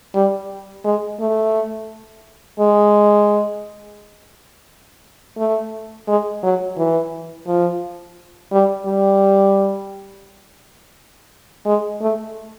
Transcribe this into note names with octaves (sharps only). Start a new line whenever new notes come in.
G3
G#3
A3
G#3
A3
G#3
F#3
E3
F3
G3
G3
G#3
A3